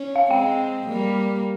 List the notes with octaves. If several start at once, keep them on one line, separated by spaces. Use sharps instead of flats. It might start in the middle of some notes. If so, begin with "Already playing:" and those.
Already playing: C#4
F5
G#3 C4 G5
G3 A#3